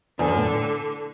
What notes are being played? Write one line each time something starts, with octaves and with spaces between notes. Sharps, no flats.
E2 D3
F#2
A2